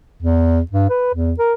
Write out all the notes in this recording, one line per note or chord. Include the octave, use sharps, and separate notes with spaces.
E2
G2
B4
E2
A#4